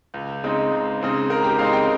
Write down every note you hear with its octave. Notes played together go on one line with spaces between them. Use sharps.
C#2
C#3 G#3 C4 D#4
C#2
C#3 G#3 C4 D#4
C#2 A#4
G4
C#3 G#3 C4 D#4 F5
G5